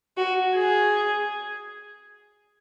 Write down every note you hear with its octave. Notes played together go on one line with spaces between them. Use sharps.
F#4
G#4